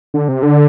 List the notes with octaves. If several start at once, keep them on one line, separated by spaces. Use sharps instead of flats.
D3
C3
D3